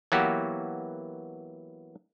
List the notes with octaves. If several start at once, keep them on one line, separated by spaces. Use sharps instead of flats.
E3 F#3 A#3 B3 F#4 G4